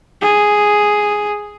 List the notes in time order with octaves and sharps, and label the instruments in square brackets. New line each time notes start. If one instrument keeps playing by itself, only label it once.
[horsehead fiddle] G#4